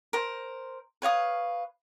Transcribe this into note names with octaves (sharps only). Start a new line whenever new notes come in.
A#4 C5
B4 C#5 F5 D#6